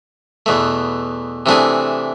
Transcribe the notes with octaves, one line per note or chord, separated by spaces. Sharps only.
E2 B2 A3
C3 E3 A3 D4 G#4